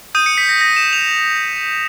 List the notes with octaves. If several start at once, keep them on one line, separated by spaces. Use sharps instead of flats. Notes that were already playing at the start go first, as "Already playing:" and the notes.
D#6 G6 D#7
C#7
B6
A#6
A#6
E7
F7